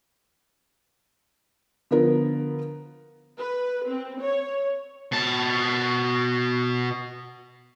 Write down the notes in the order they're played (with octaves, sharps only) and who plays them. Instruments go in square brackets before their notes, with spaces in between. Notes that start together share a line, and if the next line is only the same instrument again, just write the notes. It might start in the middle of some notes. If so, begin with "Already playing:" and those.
[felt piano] D3 F3 B3 A#4
[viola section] B4
C4
C#5
[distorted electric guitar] B2 A5